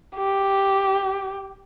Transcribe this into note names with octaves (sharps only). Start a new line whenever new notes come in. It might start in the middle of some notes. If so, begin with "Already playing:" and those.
G4